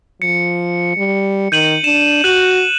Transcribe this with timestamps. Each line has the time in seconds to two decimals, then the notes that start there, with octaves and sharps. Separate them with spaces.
0.22 F3 C#7
0.97 G3
1.52 D#3 G6 D#7 F#7
1.84 D4 E7
2.24 F#4 F#6 D#7 F#7